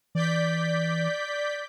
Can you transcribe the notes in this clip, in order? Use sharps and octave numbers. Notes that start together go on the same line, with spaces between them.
E3 D5 G6 B6